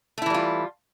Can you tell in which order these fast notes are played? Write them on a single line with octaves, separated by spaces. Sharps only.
A3 E4 E3 G3 F4